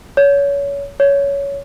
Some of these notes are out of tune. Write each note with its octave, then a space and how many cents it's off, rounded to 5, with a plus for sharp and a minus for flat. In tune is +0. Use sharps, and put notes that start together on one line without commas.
C#5 +25
C#5 +15